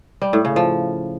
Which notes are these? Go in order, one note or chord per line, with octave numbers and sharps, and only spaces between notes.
G3
A2
C#3
F3